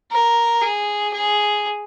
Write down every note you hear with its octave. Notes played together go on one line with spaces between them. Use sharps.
A#4
G#4
G#4